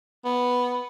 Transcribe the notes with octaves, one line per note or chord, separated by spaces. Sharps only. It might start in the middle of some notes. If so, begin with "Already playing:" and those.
B3